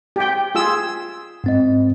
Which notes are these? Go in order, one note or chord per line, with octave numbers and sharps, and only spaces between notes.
G4 G5
F4 G#4 E6
G#2 C4 D#5